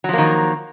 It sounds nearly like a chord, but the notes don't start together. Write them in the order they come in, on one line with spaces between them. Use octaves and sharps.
F#3 F3 A#3 D#3